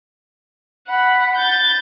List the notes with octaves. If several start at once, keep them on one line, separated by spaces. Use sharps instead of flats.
F#5 B5
G6 A6